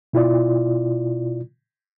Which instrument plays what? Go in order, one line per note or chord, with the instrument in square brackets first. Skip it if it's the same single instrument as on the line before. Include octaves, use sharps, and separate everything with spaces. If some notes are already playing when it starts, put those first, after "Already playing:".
[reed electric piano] B2 E4 F4 D5